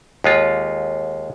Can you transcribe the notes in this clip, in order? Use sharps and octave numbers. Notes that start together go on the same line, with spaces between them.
D#2 G#3 F4